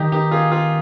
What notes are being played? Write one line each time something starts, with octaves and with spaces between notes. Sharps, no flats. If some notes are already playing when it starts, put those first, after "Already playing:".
Already playing: D#3 D#4 G4
D#4 G4
F4 G#4
F4 G#4